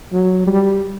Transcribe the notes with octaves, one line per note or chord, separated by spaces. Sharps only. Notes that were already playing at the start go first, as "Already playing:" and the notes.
F#3
G3